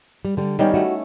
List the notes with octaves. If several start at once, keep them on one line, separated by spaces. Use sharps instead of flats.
G3
D3 G3
D#3 G3 B3 C#4
A3 E4 F#4